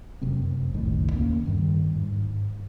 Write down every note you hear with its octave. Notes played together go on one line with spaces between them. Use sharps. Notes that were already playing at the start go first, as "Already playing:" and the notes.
F1 F#2 C3 C4
F#1 C2 A2 D#3
D#2 A#3 C#4
G2 D#3 G3
G#2